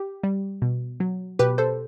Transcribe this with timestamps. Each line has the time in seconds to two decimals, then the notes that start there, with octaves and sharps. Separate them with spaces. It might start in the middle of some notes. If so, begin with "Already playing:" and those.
Already playing: G4
0.24 G3
0.62 B2
1.00 F#3
1.39 B2 G4 B4
1.58 A4 C5